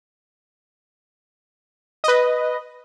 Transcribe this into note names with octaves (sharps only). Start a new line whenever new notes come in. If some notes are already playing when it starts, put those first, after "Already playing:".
B4 D#5